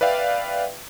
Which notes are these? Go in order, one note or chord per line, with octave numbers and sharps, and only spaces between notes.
B4 D5 E5 F5 G5